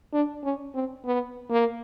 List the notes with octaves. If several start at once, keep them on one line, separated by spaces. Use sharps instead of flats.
D4
C#4
C4
B3
A#3